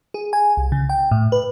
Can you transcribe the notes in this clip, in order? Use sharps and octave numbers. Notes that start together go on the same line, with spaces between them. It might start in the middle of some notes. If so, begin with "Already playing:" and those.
G#4
G#5
C2
C#3
G5
A2
B4